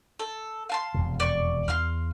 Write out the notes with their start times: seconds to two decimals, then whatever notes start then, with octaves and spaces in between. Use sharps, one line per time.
0.19 A4
0.69 F5 A5 C6
0.94 E1 F2 C3
1.20 D5 C#6
1.68 E2 F5 C6 F6